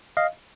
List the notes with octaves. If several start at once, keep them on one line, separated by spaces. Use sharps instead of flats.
D#5 F5